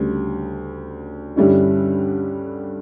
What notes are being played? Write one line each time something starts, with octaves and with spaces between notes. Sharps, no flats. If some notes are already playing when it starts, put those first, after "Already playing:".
Already playing: D2 C#3 G3
G2 D3 G3 C#4 E4